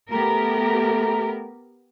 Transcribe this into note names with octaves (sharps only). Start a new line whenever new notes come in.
A3 B3 G4 A#4 A#5